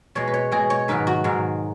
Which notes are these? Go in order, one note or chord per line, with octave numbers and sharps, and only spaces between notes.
B2 G#3 C#5
B4
C#5
B2 G#3 G#4
C#5
G#2 D#3 F#3 B4
F#4
G#2 D#3 F#3